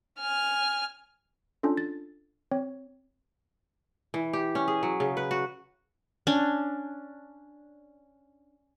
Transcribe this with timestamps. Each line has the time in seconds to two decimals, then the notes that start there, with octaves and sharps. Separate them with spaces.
0.20 G#5 F6
1.63 C#4 D4 F4 A4
1.77 A6
2.51 C4 C#5
4.14 E3
4.33 G4
4.55 C#4
4.68 G#4
4.83 F#3
5.00 C#3
5.17 B4
5.31 F#4
6.27 C#4 D4